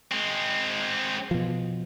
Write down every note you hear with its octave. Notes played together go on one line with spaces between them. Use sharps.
G#3 C4
B2 F3